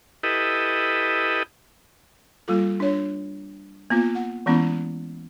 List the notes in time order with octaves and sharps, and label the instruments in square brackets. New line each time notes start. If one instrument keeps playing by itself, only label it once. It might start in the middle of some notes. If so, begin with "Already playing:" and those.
[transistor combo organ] E4 G4 A4 B4 D#5
[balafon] G3 A#3 F4 A4
D4 C#5
A#3 B3 F4
F#5
E3 G#3 B3 C#4 E4